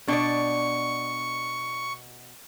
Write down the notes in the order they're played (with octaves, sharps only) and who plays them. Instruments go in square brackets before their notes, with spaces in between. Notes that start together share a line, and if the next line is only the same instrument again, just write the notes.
[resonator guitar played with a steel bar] B2 D5 [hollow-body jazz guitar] D4 [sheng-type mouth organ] C#6